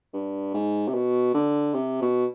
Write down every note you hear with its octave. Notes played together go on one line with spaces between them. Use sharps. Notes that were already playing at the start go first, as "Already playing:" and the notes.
G2
G#2
C3
B2
D3
C3
B2